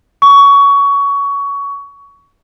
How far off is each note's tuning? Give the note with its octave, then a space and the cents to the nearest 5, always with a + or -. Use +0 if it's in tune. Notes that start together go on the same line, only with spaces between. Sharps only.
C#6 +20